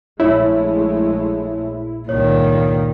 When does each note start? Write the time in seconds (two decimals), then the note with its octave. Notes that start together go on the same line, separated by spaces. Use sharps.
0.20 A#1 G#3 A3 E4 C#5
2.09 C#2 G2 A#2 D#3 C#5